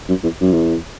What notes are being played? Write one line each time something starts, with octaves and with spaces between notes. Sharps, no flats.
F#2
E2
F#2
E2